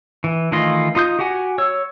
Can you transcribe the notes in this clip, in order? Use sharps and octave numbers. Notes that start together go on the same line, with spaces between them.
E3
D#3 E3 A3 F4 D#5
D#4 F4 D#6 G6
F#4 G4 F#5 G#5
C#5 E6